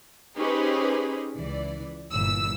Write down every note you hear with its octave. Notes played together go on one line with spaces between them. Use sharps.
C#4 D#4 G4 G#4 B4 C5
C#2 E3 D5
G1 A#2 E3 E6